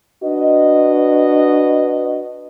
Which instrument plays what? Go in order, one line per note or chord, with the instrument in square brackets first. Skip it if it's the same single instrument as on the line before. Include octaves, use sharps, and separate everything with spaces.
[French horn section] D4 F#4 B4 D#5